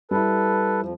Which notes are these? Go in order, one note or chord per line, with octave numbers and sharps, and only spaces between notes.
G3 E4 A4 B4
F2 F3